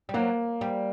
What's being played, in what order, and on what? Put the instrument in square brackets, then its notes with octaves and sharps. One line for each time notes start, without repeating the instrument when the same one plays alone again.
[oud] G3
[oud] F#3 [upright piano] A#3
[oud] G3